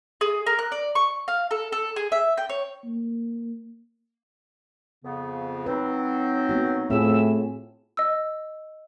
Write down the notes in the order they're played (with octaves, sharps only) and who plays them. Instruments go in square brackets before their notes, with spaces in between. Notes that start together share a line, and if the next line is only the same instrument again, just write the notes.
[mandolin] G#4
A#4
F#6
D5
C#6
F5
A4
A4
G#4
E5
G5
C#5
[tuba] A#3
[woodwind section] F2 C#3 B3
[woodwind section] F#3 C4 D#4 [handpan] B4
[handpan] A#3 B3 F#4
[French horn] A2 [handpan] C4 F4 G#4 [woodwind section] E5 E6
[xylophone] D#5 E6